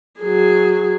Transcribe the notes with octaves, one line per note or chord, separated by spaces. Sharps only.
F#3 G#4